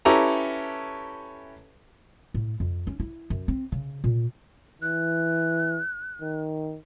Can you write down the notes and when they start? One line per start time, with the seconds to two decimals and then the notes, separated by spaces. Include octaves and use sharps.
0.05 C#4 E4 G4 A4 B4 A#5
2.34 A2
2.60 F2
2.87 C#4
3.00 E4
3.30 F#2
3.48 C4
3.72 C#3
4.04 A#2
4.82 E3 F#6
6.22 D#3